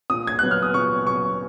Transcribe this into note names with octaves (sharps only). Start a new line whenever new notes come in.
A#2 D#6
G#6
F#3 B3 F#6
F6
D#6
A#2 C#6
F#3 B3 C#6